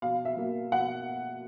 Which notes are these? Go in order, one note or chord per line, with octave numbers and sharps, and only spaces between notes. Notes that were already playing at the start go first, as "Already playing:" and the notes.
B2 F5
E5
F#3 A#3
B2 F#5